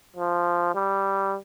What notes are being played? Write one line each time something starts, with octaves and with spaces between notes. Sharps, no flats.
F3
G3